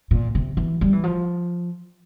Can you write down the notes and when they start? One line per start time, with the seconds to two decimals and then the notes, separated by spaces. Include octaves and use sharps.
0.11 A#2
0.35 C3
0.57 E3
0.81 G3
0.93 E3
1.04 F3